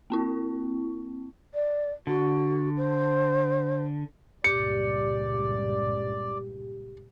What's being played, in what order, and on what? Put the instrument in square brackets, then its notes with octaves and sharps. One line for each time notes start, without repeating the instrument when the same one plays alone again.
[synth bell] A#3 C4 E4
[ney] D5
[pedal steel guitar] D3 [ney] F#4
[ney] C5
[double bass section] C#2 G2 A#2 [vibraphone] G4 [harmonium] D5 [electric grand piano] C#7